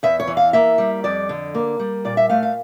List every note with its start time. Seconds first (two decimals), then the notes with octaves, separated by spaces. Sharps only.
0.03 E2 E5
0.20 C#5
0.28 E3
0.37 F5
0.53 A#3 E5
0.78 G3
1.04 F2 D5
1.29 D3
1.55 A#3
1.79 G3
2.05 A#2 D5
2.17 E5
2.29 A3 F5
2.43 F5